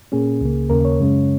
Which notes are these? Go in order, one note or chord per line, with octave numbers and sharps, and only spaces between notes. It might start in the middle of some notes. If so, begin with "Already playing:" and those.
A#2 A#3 C#4 G#4
C#2 C#3 A#3
D#2 C#3 A#3 A#4
C#5
F#2 C#3 G#3 C#4